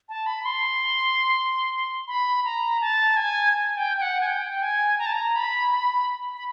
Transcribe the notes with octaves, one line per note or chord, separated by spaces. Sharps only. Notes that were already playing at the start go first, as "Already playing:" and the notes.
A5
B5
C6
B5
A#5
A5
G#5
G#5
G5
G5
F#5
G#5
G5
G#5
A#5
A5
A#5
B5
B5
B5